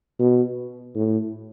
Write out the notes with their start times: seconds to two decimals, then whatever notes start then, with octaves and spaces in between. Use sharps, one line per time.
0.19 B2
0.95 A2